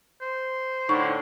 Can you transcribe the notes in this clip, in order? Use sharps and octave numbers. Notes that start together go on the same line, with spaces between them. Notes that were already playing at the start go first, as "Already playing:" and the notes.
C5
A2 D3 D#4 C#6